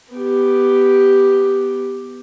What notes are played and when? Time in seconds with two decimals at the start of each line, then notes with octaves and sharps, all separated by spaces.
0.13 B3 G4